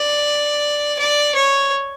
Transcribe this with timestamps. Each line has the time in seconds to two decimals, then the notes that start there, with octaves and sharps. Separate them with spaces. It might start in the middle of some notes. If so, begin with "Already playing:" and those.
Already playing: D5
0.99 D5
1.35 C#5